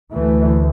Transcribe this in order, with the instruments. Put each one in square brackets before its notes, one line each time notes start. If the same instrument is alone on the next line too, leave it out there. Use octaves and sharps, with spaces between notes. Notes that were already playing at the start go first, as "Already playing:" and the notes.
[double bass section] D2 E3 A3